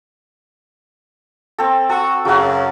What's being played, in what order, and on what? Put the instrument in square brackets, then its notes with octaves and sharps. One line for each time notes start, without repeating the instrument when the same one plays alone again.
[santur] C4 A4
[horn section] F#4 [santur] A4
[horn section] F#2 C#3 [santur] F#3 F#4